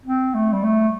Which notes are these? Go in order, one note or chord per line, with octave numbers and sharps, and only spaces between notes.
C4
A3
G3
A3